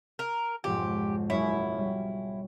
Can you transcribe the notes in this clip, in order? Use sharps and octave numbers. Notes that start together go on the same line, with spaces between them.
A#4
B1 F2 G#2 G4
F#1 F#2 E4 C#5
G3